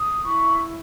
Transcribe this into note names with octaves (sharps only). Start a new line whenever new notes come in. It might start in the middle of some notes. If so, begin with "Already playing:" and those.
Already playing: D#6
E4 B5 C#6